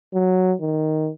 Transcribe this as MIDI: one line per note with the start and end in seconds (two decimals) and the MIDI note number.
0.14 0.54 54
0.61 1.10 51